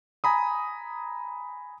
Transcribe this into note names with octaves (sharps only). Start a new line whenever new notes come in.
G#5 A#5 B5 D#6